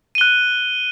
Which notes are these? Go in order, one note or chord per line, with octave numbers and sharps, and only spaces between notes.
F#6 D#7 G7